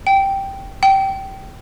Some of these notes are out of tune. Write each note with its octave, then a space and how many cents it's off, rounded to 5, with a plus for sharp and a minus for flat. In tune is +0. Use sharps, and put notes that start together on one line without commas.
G5 -5
G5 -20